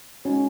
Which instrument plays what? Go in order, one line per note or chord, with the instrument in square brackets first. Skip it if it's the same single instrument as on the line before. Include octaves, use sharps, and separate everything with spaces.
[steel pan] G#3 C#4 D#4 F#4 C#5